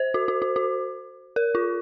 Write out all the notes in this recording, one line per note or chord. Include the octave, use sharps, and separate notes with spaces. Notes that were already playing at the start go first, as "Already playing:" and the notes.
Already playing: C5
F#4
F#4
F#4
F#4
A#4
F4